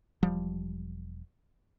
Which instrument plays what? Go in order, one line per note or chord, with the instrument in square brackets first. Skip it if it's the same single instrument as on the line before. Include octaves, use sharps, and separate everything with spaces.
[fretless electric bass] E1 F3 G3